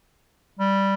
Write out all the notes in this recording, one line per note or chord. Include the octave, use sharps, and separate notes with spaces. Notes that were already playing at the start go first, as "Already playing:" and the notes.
G3